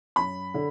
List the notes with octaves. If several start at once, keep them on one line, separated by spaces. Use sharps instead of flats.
F#2 B5
D3